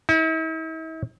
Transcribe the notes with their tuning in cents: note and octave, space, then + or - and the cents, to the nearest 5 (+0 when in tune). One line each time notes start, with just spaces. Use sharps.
E4 -45